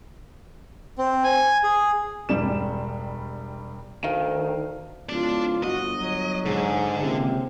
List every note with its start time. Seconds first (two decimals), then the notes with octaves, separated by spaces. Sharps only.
0.98 C4
1.24 G#5
1.63 G#4
2.29 E1 G2 G3 E7
4.04 D2 D#3 F5
5.09 D1 D4 F4 D5
5.63 G1 F#4 D#5
5.94 F#3
6.46 G#2 D3
7.02 C#2 C3 A#3